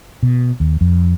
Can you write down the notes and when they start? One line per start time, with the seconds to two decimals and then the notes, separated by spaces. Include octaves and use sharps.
0.23 B2
0.60 D#2
0.81 F2